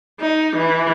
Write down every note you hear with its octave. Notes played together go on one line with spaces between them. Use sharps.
D#4
E3